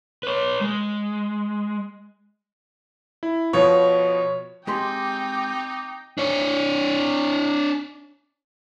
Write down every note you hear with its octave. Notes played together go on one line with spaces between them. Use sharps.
B4 C#5
G#3
E4
B2 F3 B3 C#5
G#3 C4 D#4 G4 G5 C6 D6
D4 C#5